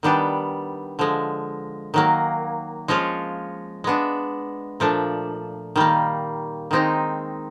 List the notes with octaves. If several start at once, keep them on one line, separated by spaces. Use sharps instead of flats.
D#3 G3 B3 D4 G4
D3 F3 G#3
D#3 F#3 A#3
F3 G#3 C#4 F4
G#3 B3 D4
A#2 F3 A3 D4
D#3 G3 A#3
D#3 G#3 C4 D#4